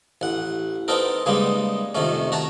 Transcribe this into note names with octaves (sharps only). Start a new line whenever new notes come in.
A1 F#5
B3 C4 D#4 A4 A#4
C#3 G3 G#3 A#3 B3 D#4
F2 C3 D#3 A3 C#4
F#4 C#5 A5 A#5